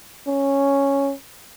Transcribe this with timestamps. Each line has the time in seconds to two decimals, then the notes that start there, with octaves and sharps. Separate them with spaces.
0.27 C#4